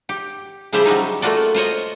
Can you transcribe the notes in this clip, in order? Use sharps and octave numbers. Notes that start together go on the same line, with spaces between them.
G4
C#3 F3 G3 E4 C5 E5
F#3 G3 C#4 D#4
A3 A#3 F4 F#4 D5
F4 C5 C#5 D#5